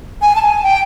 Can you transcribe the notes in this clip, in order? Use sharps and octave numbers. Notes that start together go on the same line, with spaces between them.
G#5
A5
G#5
G5